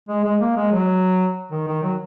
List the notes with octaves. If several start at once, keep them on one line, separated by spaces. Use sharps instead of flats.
G#3
G#3
A#3
G#3
F#3
D#3
D#3
F#3